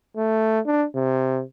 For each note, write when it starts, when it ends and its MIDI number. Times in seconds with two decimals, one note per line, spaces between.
0.17 0.60 57
0.66 0.86 62
0.95 1.43 48